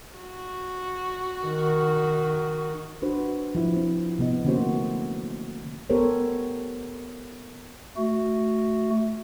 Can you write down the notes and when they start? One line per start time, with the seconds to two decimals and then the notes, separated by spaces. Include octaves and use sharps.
0.17 F#4
1.44 D#3
3.02 D4 F#4 B4 C5
3.55 F3 E4
3.76 C4
4.19 C3 B3 D#5
4.45 D3 A3 A#3 C#4 F#4 C5
5.90 B3 G4 A4 A#4 C5 C#5
7.97 A3 F#4